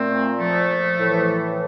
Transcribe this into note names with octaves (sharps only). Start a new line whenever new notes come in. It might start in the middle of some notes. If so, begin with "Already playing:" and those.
Already playing: A#2 A3 C4
F3 A3
A2 E3